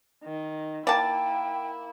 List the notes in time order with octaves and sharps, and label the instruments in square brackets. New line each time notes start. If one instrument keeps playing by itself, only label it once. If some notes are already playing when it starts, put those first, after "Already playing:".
[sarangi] D#3
[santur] A#3 F#5 D6 [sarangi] E4 [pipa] D5 A5 [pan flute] G5